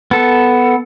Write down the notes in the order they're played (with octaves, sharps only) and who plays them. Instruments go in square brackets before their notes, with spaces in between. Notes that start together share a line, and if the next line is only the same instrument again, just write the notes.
[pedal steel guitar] B3 A4